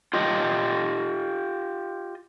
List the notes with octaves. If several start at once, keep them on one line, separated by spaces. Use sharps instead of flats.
F4 G4 D#5